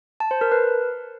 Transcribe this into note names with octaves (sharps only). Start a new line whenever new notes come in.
A5
C5
A#4
B4